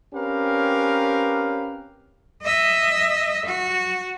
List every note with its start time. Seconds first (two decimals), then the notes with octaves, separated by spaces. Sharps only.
0.13 C4 C#4 G4 A#4 B4 F5
2.42 D#5 E5
3.45 F#4